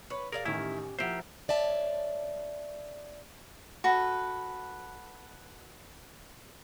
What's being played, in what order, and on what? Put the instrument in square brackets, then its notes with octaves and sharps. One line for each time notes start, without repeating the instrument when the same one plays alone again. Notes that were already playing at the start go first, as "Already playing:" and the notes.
[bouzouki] B4 C#5
[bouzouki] G#4 D5 F5 [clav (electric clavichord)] A#4
[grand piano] A1 D#3 [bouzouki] C#4 G4 [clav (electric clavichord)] E4
[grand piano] F3 F#5 [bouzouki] A#3 E4 [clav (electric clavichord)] G4 C5
[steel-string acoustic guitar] C#5 D5 E5 A5
[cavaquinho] F#4 A4 B4